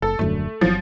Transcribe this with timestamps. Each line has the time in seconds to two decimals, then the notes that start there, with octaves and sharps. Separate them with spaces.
0.02 F#1 A4
0.19 D#1 F#2 D3 A3
0.61 G1 F3 F#3